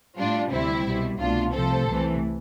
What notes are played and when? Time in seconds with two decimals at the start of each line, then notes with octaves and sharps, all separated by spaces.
0.17 A2 G3 D4 F4
0.51 D2 C3 G3 C4 E4
0.85 C2 B2 G3
1.19 C2 B2 A3 D4 F4
1.53 C2 C3 F3 A3 A4 C5
1.87 C2 C3 E3 A3